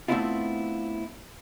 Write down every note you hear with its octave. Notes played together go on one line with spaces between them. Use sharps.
A3 B3 C4 D4 E4 F4